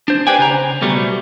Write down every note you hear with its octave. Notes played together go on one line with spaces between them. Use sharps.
D4 C5
G4 B4 C5 D5 G5 G#5
C#3 C5 A#5
B1 B2 G3 A3